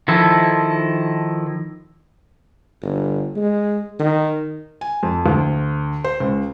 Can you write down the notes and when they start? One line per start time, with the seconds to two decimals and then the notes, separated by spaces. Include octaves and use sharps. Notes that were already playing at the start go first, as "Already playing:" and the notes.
0.08 D#3 F3 E4 A4
2.82 G1
3.36 G#3
4.00 D#3
4.81 G#5
5.03 F2
5.26 D2
6.04 C5
6.20 C#2